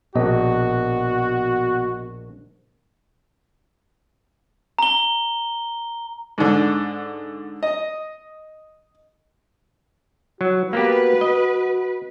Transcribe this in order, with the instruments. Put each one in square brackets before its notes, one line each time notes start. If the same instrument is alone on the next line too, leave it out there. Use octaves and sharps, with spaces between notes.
[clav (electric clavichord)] A#1 [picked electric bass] B2 [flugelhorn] F#4 [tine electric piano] D#5
[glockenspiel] A#5 G7
[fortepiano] G#2 D3
D#5
[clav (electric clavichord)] F#3 [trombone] F#4
[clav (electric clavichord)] A#3 B3 G4 [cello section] B4
[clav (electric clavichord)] D#5